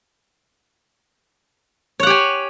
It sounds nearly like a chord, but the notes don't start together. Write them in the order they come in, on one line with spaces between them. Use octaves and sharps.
C#5 F#5 G4 G#5